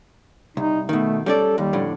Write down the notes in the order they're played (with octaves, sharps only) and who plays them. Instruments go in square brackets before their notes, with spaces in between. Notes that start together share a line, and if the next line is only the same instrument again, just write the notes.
[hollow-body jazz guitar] C2 [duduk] D#4
[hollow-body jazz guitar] B2 D#3 [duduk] A3
[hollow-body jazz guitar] G3 C#4 D5 [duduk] A4
[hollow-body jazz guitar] D#2 [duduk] G3
[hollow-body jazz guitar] F2 A2 D3